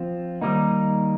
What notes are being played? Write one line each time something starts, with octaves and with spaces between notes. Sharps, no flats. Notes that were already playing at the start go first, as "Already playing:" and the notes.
Already playing: F3 C4 F4
D#3 G3 A#3 D#4